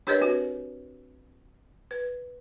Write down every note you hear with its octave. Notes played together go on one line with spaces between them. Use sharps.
D4 G4 A#4 B4 C#5 D#5
C4 F#4 B4
B4